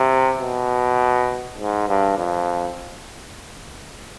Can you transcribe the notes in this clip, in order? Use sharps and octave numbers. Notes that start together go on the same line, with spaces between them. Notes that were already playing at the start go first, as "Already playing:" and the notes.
Already playing: C3
B2
G#2
G2
F2